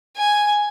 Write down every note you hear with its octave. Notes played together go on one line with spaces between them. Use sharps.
G#5